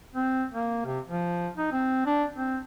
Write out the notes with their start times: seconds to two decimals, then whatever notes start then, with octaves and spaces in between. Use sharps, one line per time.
0.15 C4
0.53 A#3
0.85 C3
1.09 F3
1.57 D#4
1.72 C4
2.06 D4
2.35 C4